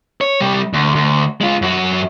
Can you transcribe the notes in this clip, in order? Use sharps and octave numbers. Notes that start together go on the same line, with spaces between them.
C#5
C3 G3
D2
D2
G#3 F4
F#2 F#4